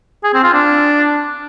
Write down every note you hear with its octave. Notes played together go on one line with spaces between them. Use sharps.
G#4
C4
F4
D4